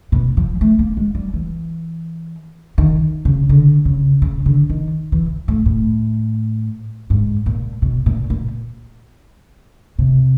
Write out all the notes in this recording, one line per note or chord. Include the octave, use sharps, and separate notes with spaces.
B2
F3
A3
A#3
G#3
G3
E3
D#3
C#3
D3
C#3
C#3
D3
D#3
E3
A2
A2
G#2
A#2
B2
A#2
A#2
C3